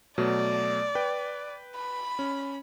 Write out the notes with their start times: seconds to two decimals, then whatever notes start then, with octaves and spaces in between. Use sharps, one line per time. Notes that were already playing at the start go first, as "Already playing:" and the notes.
0.18 B2 F#3 A3 D5
0.95 B4 G5
1.76 B5
2.19 C#4